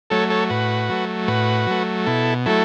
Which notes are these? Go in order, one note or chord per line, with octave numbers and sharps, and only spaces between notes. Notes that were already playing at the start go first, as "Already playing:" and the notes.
F#3 A3 A4 C#5
A4 C#5
A2 F#4 B4
F#3 A3
A2 F#4 B4
F#3 A3
B2 E4 A4
F#3 A3 E4 A4